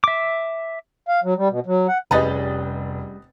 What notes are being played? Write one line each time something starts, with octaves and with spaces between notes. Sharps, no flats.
E5 D6
F5
F#3
G3
B2
F#3
F#5
F1 G3 C#4 G#4 B4 D#5 A6